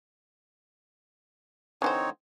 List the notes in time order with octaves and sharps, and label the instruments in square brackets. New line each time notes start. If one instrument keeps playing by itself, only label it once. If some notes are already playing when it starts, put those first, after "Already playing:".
[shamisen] D3 E3 C5 [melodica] C4 D#4 C#5